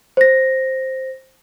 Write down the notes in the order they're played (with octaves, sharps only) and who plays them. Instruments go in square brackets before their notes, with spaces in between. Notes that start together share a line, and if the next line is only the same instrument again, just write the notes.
[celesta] C5 A#6